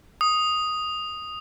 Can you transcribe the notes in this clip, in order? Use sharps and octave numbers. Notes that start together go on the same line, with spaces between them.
D#6